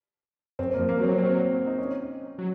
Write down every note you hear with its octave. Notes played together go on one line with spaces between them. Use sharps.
F#2 C4
F3 A#3
A#3
F#3 C4
C4
D#4
C#4
F#3